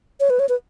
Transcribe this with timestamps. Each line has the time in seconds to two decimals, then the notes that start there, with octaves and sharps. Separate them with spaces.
0.20 C#5
0.30 B4
0.39 C#5
0.49 B4